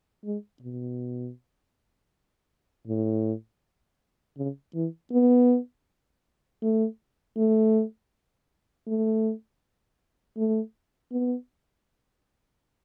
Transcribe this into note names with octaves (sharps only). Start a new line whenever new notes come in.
G#3
B2
A2
C#3
E3
B3
A3
A3
A3
A3
B3